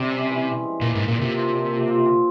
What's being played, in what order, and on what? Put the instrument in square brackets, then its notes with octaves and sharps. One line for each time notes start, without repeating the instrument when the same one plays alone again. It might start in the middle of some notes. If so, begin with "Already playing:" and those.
Already playing: [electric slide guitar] C3 [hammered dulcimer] G3
[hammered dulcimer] C#4
E3
C4
G#3
[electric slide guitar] A#2 [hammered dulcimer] A#3
[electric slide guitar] G#2
[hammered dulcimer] A#3
[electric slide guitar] A#2
[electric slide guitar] C3 [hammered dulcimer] F4
[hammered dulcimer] F3
A#2
A#2
F4
C4